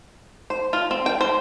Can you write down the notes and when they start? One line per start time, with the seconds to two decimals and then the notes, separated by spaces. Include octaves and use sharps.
0.50 C5
0.73 F4
0.91 C4
1.06 G5
1.21 C5